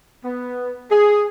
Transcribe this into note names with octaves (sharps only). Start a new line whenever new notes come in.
B3
G#4